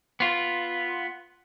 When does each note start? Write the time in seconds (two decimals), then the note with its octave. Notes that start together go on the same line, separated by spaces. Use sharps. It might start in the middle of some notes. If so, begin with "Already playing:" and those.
0.20 B3 F4